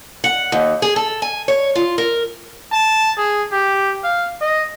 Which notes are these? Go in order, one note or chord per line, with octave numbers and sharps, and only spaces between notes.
F#5
D#2
G#4
A4
G#5
C#5
F4
A#4
A5
G#4
G4
F5
D#5